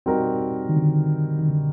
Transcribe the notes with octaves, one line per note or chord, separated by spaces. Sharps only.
G3 C4 D#4 F#4 A#4
D#3
D3
D#3
D3